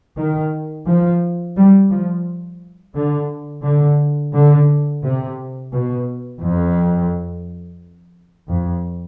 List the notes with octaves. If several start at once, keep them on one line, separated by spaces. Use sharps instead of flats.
D#3
F3
G3
F3
D3
D3
D3
C3
B2
F2
F2